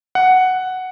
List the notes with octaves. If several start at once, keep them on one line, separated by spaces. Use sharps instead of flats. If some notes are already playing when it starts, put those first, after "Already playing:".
F#5